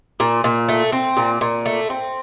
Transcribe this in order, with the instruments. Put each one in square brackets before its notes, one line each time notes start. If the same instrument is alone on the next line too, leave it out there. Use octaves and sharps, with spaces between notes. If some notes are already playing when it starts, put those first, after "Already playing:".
[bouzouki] A#2
A#2
A3
C4
A#2
A#2
A3
C4